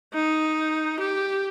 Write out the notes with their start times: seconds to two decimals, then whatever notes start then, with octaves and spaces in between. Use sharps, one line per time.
0.14 D#4
1.00 G4